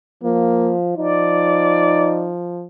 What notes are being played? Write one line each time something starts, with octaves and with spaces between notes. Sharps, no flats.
F3 A#3
F3 D#4 D5